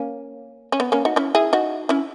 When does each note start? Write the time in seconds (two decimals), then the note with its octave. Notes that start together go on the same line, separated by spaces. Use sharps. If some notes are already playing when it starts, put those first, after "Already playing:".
Already playing: A#3 C#4
0.72 C#4
0.80 B3
0.92 A#3 C#4
1.05 D#4 F#4
1.16 C#4 E4
1.35 E4 G#4
1.53 D#4 F#4
1.89 C#4 E4